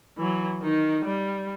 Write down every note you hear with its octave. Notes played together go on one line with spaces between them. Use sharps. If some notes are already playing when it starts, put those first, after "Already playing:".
E3 F#3
D#3 D#4
G3